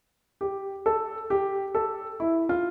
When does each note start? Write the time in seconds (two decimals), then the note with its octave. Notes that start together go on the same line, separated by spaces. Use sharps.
0.41 G4
0.86 A4
1.30 G4
1.75 A4
2.20 E4
2.49 F4